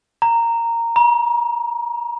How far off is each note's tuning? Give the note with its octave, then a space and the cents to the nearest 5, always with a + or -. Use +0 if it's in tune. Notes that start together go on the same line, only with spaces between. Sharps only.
A#5 -10
A#5 +40